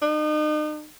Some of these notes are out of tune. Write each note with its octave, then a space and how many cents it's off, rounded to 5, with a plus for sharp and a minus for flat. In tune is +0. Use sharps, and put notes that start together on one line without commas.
D#4 -40